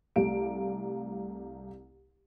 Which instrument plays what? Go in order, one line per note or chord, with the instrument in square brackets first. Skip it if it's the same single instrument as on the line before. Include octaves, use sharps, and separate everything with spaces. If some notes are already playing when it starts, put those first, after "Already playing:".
[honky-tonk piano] C2 A3 G4 F5 D7